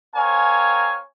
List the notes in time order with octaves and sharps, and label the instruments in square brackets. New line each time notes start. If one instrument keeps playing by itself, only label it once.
[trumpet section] C4 A#4 C#5 F5 G#5